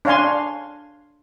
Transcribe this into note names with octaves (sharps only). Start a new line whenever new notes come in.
D4 C#5 F5 G#5 C6